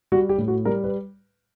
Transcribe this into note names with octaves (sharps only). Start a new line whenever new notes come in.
G3 F#4
G4
A2
F#4
G3 A#4
B4